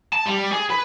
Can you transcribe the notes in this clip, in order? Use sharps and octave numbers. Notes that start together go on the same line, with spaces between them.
A5
G3
G#4
B4